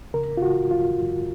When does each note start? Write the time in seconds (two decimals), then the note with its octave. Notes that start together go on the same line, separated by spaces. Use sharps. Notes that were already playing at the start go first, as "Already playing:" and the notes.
0.14 C#3 A#4
0.37 F4
0.42 C#3 F#4
0.71 F#2 F4
0.99 F#2